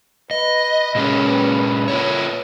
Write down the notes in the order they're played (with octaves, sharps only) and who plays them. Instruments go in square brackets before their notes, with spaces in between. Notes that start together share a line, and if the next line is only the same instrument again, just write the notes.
[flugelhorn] B4 [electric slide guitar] D#5
[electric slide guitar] A#2 G#3 C#4
F4 A4 C#5